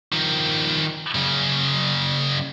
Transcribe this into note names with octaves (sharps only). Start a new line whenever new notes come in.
D#3 F3
F#2 C#3